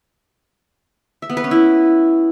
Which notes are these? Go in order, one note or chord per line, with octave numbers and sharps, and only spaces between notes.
E5
B3
B4
C#4
E4